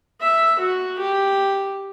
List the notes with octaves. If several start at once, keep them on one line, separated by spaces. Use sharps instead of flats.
E5
F#4
G4